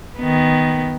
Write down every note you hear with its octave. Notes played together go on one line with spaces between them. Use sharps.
D#3 B3